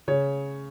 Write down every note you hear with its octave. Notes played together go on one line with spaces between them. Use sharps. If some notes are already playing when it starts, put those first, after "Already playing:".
C#3 C#5